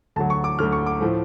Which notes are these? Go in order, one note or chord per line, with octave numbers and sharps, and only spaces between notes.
D2 D3 F#3 A5
C#6
D6
D2 D3 F#3 F6
C#6
D6
A2 F3 A3